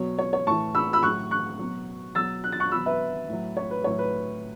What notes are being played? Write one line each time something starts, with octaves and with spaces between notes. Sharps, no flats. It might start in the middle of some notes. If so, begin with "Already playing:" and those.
Already playing: B2 F#3 C#5
C#5
C#5
A2 E3 A5 C#6
B5 E6
B5 E6
A2 F#3 C#6 F#6
C#6 F#6
B2 F#3
B2 F#3 E6 A6
F#6
A6
C#6 F#6
B2 F#3 B5 E6
B4 E5
A2 F#3
C#5
B4
A2 F#3 C#5
B4